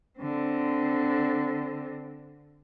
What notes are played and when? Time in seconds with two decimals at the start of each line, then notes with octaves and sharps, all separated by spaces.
0.19 D3 C4